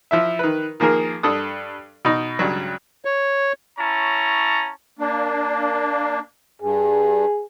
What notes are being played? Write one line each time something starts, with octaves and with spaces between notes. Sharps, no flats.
F3 E4 E5
D#3 B4
D#3 F3 A#3 G#4 A#4
G2 A4 D#6
B2 D#4
C#2 G2 F#3
C#5
C#4 E4 C#5 A5 A#5
A#3 D4
G2 G#4